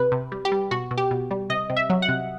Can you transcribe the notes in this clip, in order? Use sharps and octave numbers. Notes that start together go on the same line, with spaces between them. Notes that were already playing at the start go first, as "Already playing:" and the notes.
Already playing: C3 B4
C3
G3
G4
G3
B2 F#4
B2
G4
B2
G3
C3 D#5
C3
E5
F#3
F#5
C3